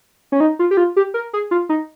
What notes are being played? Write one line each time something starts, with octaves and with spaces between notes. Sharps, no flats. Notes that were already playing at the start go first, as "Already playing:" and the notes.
C#4
D#4
F4
G4
F4
G4
A#4
G#4
F4
D#4